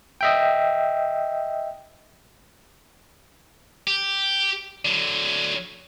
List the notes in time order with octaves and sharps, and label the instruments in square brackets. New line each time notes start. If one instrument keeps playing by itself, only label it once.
[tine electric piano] D#5 E5 G5
[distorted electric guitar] G4
D3 F#3